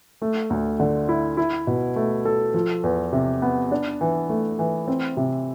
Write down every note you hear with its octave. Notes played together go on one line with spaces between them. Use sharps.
A3
D2
D3
E4
E4
B2
A3
A4
F3
E2
C3
B3
D4
E3
A3
E3
C4
C3